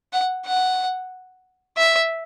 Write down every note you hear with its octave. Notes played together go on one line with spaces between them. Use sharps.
F#5
F#5
E5